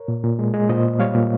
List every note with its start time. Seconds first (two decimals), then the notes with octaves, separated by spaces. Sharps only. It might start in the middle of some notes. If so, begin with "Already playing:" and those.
Already playing: A#4 C#5
0.08 A#2
0.23 A#2
0.39 G#3
0.54 G#3
0.69 A#2 C5 D#5
0.85 A#3
0.99 G3 C#5 F5
1.15 A#2